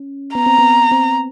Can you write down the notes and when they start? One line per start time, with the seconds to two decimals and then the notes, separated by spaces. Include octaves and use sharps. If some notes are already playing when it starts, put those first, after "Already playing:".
Already playing: C#4
0.35 B3 A#5
0.46 C4
0.59 B3
0.91 C4